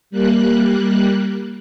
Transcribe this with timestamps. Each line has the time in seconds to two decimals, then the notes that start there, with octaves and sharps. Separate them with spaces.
0.11 G3 A#3 F#6